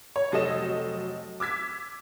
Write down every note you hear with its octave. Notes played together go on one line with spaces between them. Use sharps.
C#5
F1 F#3 A4 D#5 E7
D6 E6 G#6 B6